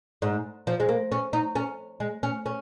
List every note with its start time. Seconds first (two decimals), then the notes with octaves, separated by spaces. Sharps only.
0.22 G#2
0.67 F3
0.80 G#3
0.89 A#3
1.12 C#4
1.33 D#4
1.55 C#4
2.00 G#3
2.23 C#4
2.46 C#4